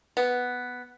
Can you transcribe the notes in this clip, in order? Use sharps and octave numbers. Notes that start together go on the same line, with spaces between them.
B3